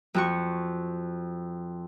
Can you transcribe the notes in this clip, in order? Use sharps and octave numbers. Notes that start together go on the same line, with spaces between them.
F2 F#4 C#6